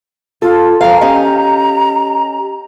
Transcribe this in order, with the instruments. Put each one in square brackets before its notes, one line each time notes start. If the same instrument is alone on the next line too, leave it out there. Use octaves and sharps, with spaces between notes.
[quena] F4 [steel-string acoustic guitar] A4
[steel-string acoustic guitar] F2 F5 [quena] A#5
[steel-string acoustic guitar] C#4 G4 D#5